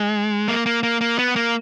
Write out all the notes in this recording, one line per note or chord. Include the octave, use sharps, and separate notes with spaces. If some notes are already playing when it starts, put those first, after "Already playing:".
Already playing: G#3
A#3
A#3
A#3
A#3
B3
A#3